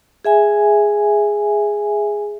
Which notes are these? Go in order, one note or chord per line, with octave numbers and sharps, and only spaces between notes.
G#4 E5 G#5